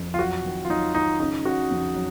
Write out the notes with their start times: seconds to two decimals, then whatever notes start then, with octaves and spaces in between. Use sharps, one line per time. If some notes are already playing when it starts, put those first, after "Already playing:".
Already playing: F2
0.14 F4
0.19 F#3 F#4
0.44 D#3
0.65 F4
0.69 F#3 D#4
0.95 D#3 D#4
1.19 C#3 D#4
1.45 C#3 F#4
1.71 F2
1.95 F#3